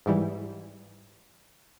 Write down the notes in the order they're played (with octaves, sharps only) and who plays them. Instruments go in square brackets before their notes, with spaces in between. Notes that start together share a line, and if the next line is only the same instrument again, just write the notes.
[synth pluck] G#2 E3 G3